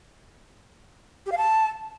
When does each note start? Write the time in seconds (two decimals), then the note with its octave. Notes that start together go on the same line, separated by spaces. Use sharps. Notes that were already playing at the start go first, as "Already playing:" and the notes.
1.26 G4
1.32 F5
1.37 A5